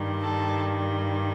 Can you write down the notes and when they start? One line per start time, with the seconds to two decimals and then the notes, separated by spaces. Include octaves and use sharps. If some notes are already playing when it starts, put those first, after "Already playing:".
Already playing: G2 D#3 G3
0.21 A4